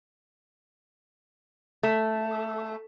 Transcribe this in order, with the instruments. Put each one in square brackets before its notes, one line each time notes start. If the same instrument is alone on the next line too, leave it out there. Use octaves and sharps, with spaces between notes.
[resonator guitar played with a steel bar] A3